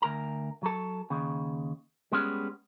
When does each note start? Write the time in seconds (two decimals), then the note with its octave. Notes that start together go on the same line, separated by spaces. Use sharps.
0.02 D2 A#4 A#5
0.63 F#3 A4
1.10 D#2 C#3
2.12 G3 G#3 B3 C#4